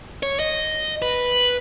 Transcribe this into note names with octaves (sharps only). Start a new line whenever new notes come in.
C#5
D#5
B4